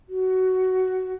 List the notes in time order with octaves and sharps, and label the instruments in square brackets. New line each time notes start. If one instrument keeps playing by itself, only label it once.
[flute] F#4